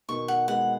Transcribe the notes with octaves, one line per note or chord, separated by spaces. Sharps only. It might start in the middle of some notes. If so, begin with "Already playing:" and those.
B2 D#3 C#6
F#5
G#3 B3 F#5